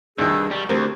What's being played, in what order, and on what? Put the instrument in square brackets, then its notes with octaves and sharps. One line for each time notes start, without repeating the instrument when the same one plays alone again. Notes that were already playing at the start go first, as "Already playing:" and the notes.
[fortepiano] C2 D#3 [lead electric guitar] G2 [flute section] G#4 E6
[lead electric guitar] G3 [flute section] C#6
[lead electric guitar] D2 [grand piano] A3 G4 A#4 [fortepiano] C4